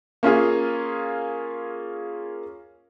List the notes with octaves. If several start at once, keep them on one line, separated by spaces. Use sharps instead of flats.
A#3 C#4 F4 G#4